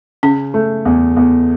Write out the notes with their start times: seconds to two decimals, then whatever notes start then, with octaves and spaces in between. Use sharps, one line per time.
0.23 C#3 C#4
0.54 A3
0.85 E2
1.17 E2